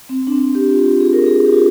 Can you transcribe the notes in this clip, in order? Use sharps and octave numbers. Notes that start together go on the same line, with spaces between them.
C4
D4
C4
G4
F4
G4
G#4
A#4
G#4
G4
F4